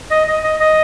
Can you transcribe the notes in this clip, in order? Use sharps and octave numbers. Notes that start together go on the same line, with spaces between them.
D#5
D#5
D#5
D#5